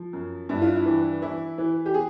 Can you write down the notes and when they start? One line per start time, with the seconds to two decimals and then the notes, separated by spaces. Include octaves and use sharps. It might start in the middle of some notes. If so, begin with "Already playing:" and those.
Already playing: F3
0.13 F#2
0.49 G2 E4
0.62 F4
0.75 E4
0.86 E3
1.22 E3 E4
1.58 E3
1.86 G4
1.94 G#4